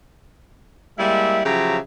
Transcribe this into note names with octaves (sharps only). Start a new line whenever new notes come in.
G3 G#3 A#3 E4 E5
C#3 F3 F#3 G4 E5 A#5